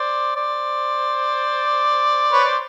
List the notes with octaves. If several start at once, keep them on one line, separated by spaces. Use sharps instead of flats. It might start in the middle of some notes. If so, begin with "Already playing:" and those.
Already playing: C5 D5
C5 D5
B4 C#5
C5 D5